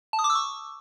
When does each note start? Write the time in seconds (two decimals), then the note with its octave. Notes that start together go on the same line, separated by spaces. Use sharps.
0.13 A5
0.19 D#6
0.24 D6
0.30 E6
0.35 C#6